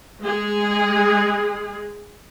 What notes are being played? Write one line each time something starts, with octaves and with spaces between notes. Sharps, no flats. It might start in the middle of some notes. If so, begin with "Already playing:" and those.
G#3 G#4